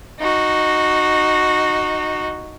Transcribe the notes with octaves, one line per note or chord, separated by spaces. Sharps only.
D#4 F#4